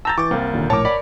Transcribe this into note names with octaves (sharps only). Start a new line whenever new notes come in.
A5 A#5 E6 G6 A6
E3 C#6 D6 A6
C2 A#3 C4
D#2 A#2 D3
A#1 A2 A#4 C#5 A5 D6
D5 B5